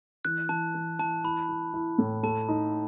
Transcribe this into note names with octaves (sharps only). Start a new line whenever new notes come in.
E3 F#6
E3 A5
E3
E3 A5
E4 B5
E4
E4
A2
A3 A5
D#4